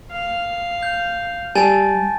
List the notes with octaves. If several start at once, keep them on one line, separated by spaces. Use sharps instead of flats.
F5
G6
G3 G#5 A5 A6